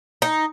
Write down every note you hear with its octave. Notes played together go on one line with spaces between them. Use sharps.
D#4